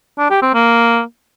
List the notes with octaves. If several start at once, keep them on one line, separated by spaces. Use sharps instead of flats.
D4
G4
C4
A#3